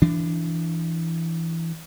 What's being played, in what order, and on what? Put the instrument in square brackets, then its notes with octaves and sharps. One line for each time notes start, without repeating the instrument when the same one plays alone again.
[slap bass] E3 D4